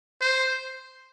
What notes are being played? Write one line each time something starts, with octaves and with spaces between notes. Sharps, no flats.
C5